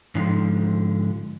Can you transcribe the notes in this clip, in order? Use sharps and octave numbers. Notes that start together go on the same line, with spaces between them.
G#2 D3 F3